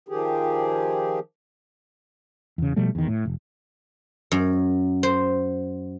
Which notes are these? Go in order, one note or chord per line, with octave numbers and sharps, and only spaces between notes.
D#3 F3 G4 G#4
E2 C#3
B2 F3 G3 A3
E2 D#3
A2
F1
F#2
C5